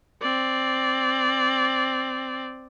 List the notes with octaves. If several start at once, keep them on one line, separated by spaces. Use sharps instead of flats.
C4 D5